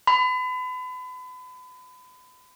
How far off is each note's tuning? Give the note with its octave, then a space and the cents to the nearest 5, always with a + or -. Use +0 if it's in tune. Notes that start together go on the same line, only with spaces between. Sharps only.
B5 +35